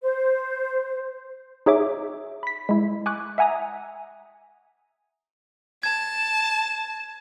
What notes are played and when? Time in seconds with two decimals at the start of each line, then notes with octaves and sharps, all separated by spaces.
0.02 C5
1.66 D#4 G#4 C#5 E5 D6
2.43 B5 B6
2.69 G#3 E4
3.06 G#5 C#6 D6 F#6
3.38 E5 F#5 G#5 A#5 D#6
5.83 A5 G#6